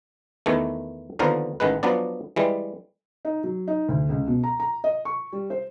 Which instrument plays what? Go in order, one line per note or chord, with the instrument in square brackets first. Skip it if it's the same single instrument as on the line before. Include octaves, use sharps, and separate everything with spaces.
[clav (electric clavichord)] E2 D#3 E3 A3
D#2 D3 F3 B3 A#4
A1 D#3 G#3 B4
F3 F#3 B3 D4 D5
E3 G3 G#3
[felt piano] D#4
F#3
D#4
D2
C#2
B2
A#5
A#5
D#5
C#6
G3
C5